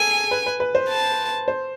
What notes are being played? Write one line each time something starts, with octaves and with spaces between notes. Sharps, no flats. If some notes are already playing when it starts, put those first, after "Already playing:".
Already playing: G#4 A4 G#5
B4
B4
B4
C5
A5
C5